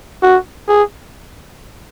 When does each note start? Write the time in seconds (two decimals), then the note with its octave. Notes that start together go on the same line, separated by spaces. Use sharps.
0.23 F#4
0.68 G#4